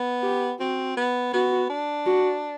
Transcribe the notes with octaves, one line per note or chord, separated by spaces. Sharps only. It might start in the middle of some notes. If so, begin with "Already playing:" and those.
Already playing: B3
G4
C4 F#4
B3
B3 F#4
D4
F#4